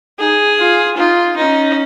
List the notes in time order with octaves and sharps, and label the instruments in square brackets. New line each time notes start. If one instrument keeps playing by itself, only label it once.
[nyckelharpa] D#4 [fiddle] G#4
[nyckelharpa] F4
[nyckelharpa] D#4 [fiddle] F4
[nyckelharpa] C#4 [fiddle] D#4